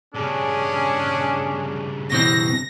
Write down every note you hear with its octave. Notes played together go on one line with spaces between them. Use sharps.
G2 C#3 C#4 D4 G#4
B2 E3 C4 A#6